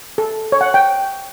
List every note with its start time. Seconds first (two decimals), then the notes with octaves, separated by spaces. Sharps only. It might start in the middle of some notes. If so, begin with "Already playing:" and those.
0.18 A4
0.52 C#5
0.61 F#5
0.74 G5